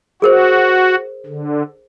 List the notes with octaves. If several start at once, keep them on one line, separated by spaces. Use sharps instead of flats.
F#4 G#4 A#4 C5
D3